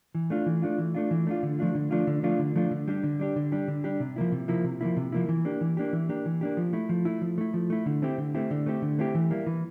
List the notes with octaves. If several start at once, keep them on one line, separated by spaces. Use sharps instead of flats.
E3
A3 D4 F4
E3
A3 D4 F4
E3
A3 D4 F4
E3
A3 D4 F4
D3
F3 A3 D4 F4
D3
F3 A3 D4 F4
D3
F3 A3 D4 F4
D3
F3 A3 D4 F4
D3
G3 D4 G4
D3
G3 D4 G4
D3
G3 D4 G4
D3
G3 D4 G4
C3
F3 A#3 E4
C3
F3 A#3 E4
C3
F3 A#3 E4
C3
F3 A#3 E4
E3
A#3 D4 G4
E3
A#3 D4 G4
E3
A#3 D4 G4
E3
A#3 D4 G4
F3
A3 E4
F3
A3 E4
F3
A3 E4
F3
A3 E4
D3
A3 C4 E4 G4
D3
A3 C4 E4 G4
D3
A3 C4 E4 G4
D3
A3 C4 E4 G4
E3
G3 A#3 E4
E3